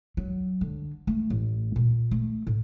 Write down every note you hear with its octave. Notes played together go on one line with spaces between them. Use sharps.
F#3
D3
A3
A1
A#2
A3
A2